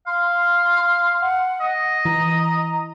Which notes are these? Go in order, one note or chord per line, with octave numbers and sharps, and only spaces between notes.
F5 C6
F#5
D#5
E3 A#5